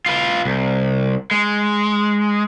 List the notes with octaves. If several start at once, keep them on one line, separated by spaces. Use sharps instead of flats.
F4 B4
C2
G#3